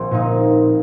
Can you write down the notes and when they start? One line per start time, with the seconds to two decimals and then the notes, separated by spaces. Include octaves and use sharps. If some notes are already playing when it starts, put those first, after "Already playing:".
Already playing: A#1 C4
0.11 A#2 A#3 D#4